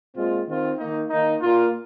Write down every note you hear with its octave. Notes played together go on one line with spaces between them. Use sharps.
A#2 G#3 C4 F4
D#3 C4 F4
D#3 A#3 D#4
D#3 A#3 D#4
A#2 A#3 F4